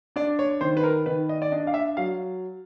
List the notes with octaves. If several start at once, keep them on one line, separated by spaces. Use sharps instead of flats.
D4 D5
C#5
D#3 C5
B4
A#4
D#3 B4
D#5
D5
D4 D#5
F5
E5
F#3 F5